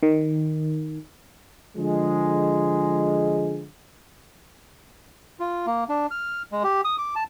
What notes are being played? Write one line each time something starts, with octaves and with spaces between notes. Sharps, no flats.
D#3
D3 F3 G#3
F4
A#3
D4
F6
G#3
G4
D#6
D6
A5